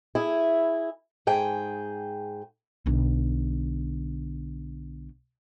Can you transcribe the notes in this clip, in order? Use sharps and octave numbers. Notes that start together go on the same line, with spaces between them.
E4 G#4
G#2 G#4 G5
B1 D3